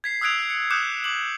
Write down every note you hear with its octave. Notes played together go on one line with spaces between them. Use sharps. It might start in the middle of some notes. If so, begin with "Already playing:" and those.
G#6 B6 C7
D#6 E6 F#6 G#6 D7 F7
C#7
D6 D#6 F#6 G6 C#7 E7
D6 F#7